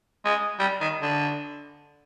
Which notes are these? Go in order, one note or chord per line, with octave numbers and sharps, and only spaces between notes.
G#3
G3
D#3
D3